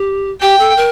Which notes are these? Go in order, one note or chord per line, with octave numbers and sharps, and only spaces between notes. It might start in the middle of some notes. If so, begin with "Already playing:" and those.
Already playing: G4
G4 G5
A4
A#4